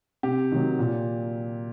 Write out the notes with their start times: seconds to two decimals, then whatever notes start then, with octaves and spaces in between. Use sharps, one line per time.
0.23 C3 G4
0.52 D#3 F#3
0.79 A#2